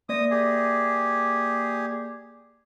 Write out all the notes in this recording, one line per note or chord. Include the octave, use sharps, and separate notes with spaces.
A#3 D5 D#6 A#6
G4 G#4